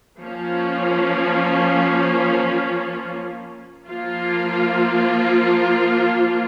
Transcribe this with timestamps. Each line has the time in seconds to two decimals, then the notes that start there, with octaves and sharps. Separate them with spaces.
0.21 F3 A#3 C#4
3.89 F3 A#3 F4